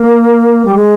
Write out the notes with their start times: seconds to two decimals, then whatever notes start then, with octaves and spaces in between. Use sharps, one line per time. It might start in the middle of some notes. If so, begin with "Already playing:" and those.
Already playing: A#3
0.65 G3
0.74 G#3